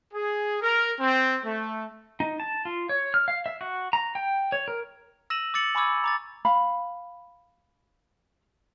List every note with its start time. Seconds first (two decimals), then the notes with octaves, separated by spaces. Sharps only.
0.13 G#4
0.61 A#4
0.99 C4
1.44 A3
2.20 D#4
2.40 A5
2.65 F4
2.89 C#5
3.14 F6
3.28 F5
3.46 E5
3.61 F#4
3.93 A#5
4.15 G5
4.52 C#5
4.68 A#4
5.30 E6 A#6 D#7 E7 F#7
5.54 D6 E6 A6 C#7 F#7
5.75 G#5 B5 C#6 D6 E6 G#6
5.87 D6
6.04 A#5 D6 A6
6.45 F5 B5